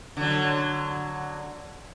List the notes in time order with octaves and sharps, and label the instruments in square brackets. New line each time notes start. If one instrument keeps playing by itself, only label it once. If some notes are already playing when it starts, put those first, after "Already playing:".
[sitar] D3 F#3